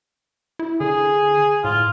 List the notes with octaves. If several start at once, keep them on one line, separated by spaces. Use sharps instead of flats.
E4
D3 G#4
A2 F4